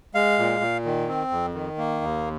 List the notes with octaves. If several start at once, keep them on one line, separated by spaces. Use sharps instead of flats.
G#3 F5
A#2
A#2
D#3
C4
F2
D#3
A#3
D#2